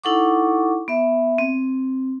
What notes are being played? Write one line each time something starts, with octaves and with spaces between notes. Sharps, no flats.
D#4 E4 A4 F#5 C#6 D6
B3 E5
C4